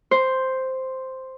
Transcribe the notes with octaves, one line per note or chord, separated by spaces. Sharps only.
C5